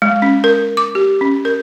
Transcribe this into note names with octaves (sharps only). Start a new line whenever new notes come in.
G#3
C#4
A#4
D6
G4
C#4
A#4